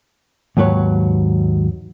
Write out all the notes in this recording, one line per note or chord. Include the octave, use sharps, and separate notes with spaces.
D#2 G#2 F#3 B4 C#5